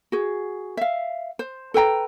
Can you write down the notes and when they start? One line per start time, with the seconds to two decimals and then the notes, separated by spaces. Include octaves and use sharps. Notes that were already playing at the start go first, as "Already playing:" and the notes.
0.12 F#4 G#4
0.77 E5 F5
1.39 C5
1.74 A4 B4 G5 A#5